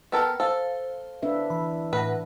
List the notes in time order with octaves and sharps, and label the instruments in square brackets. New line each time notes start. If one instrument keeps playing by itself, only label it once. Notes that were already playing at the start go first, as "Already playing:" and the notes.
[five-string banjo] B3 A4 A#4 [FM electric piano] G5 A5
[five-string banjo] A4 [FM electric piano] C5 F5
[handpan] D4 B4 E5
[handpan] E3 [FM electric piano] B5
[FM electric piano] A2 F#5 A#6 [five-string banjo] B4